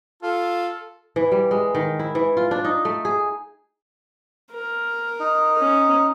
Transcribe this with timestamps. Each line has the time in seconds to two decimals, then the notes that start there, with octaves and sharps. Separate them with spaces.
0.23 F4 A4
1.16 E3
1.31 G3
1.51 G#3
1.75 D#3
1.99 E4
2.15 E3
2.37 F4
2.51 D4
2.65 D#4
2.85 A3
3.05 G#4
4.52 A#4
5.20 D#4
5.59 C#4